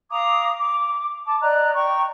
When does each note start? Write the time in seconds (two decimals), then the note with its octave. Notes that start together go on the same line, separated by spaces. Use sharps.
0.11 F5 A#5 D6 D#6
0.58 D6
1.25 A5 D6
1.41 D5 D#5 A#5 F#6
1.74 G5 A#5 C#6